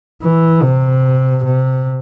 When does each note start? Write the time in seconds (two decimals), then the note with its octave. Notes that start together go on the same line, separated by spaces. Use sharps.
0.22 E3
0.63 C3
1.45 C3